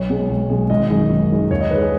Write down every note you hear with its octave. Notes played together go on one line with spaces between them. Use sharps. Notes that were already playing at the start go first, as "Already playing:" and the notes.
Already playing: B1 C#5
B2 G#3
B1
B2 G#3
G#1 D#5
F#2 D#3 G#3
G#1
F#2 D#3 G#3
D#2 C#5
D#5
D#3 G#3 B4
G#4